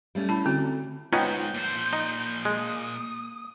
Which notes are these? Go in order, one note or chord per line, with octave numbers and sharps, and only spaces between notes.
G3 A3 C#4
E4 A5 B5
D3 C4 F#4
G#2 B3 C#4 D#4 F4 G5 G6
A#2 C5
D#4
G#3 D#6